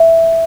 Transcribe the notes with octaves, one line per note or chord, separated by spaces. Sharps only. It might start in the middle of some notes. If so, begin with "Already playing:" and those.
Already playing: E5